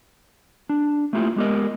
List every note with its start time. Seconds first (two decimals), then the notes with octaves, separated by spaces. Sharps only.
0.69 D4
1.13 A3 A#3 E4 F4 G4
1.36 G#3 B3 G4 A#4 D#5